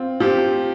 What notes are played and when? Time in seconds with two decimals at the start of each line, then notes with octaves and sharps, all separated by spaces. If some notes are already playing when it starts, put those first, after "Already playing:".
Already playing: C4 F4
0.20 F3 G4